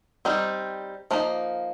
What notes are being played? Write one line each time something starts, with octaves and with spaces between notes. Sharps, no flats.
G3 C4 D#4
F3 A#3 D#4